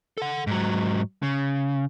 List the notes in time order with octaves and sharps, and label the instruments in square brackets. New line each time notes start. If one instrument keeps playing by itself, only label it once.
[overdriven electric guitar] A4 F#5
G#2 F#3
C#3